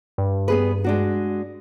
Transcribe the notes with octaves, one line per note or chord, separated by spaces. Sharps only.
G2
B3 G#4 B4
G#3 D4 F#4